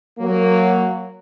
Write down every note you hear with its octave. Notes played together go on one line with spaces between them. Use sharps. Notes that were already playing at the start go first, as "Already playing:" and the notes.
F#3 A#3